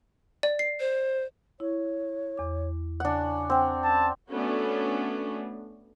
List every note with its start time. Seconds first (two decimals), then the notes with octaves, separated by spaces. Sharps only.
0.43 D5
0.59 C7
0.80 C5
1.60 E4 C#5
2.37 E2 D6
3.00 C#3 D4 F#5
3.50 C4 F#5 G5
3.84 C#4 A5
4.30 A3 B3 C#4 D4 F#4